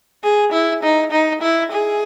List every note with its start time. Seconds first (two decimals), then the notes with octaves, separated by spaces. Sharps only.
0.23 G#4
0.52 E4
0.83 D#4
1.12 D#4
1.42 E4
1.71 G#4